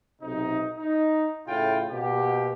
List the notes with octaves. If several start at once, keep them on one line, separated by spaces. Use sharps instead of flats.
B1 C3 D#4
D#4
A2 C#3 E4 F4 G5
B2 A#3 G4